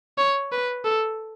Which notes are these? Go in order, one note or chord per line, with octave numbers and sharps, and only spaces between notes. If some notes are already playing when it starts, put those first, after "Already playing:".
C#5
B4
A4